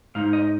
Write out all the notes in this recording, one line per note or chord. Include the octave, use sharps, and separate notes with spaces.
G#2 G#3 D#4 F5
D#5